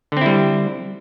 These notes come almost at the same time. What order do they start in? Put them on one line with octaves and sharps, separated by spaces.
D3 C4 E4 G3